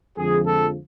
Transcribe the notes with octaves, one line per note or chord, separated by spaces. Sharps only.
F2 D3 F3 G#3 G#4
A4